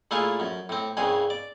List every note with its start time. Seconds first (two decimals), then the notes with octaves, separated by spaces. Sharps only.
0.11 A#2 A3 E4 F4 G#4
0.40 F#2
0.69 A2 C4
0.97 C2 G2 C#3 G#4 C6
1.30 D5